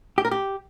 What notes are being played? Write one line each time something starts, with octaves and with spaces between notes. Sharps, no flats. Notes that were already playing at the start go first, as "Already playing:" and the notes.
G4
A#4
G4